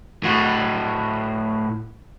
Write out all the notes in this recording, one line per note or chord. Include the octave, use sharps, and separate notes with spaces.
A2 F#4